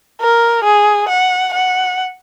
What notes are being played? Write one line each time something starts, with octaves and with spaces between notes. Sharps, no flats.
A#4
G#4
F#5
F#5